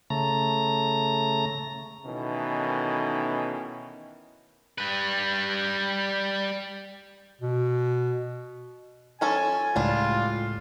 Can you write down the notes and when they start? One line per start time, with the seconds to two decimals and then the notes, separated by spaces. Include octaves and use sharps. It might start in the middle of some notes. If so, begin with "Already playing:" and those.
0.10 C#3 A3 A#5
2.05 B2 D#3 E3 A3 C#4
4.78 G3 B4
7.42 B2
9.21 F3 C#4 A4 G#5
9.76 C#2 A2 G3 D4 F4